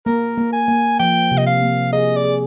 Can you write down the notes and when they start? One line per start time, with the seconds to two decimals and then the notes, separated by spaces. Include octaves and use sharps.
0.06 A#3 A#4
0.38 A#3
0.53 G#5
0.68 A#3
1.00 F3 G5
1.31 C3
1.38 D#5
1.46 F5
1.62 A#3
1.93 G#4 D#5
2.16 D5
2.25 G#4